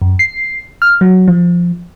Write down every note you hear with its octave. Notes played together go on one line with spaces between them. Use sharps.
F#2
C7
F6
F#3
F3